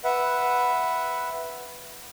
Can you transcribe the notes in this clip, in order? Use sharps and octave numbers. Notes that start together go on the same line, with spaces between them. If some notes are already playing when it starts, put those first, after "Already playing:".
B4 E5 F#5